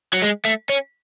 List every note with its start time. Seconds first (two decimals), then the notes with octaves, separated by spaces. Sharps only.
0.13 F#3
0.22 G#3
0.45 A3
0.69 C#4